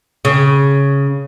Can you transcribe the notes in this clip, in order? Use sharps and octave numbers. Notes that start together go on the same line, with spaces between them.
C#3